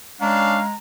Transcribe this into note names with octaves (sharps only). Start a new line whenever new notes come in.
G#3 C#4 D4 F5 A#5